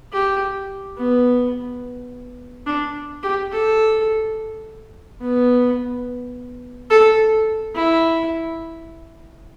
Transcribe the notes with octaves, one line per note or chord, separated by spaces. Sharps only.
G4
B3
D4
G4
A4
B3
A4
E4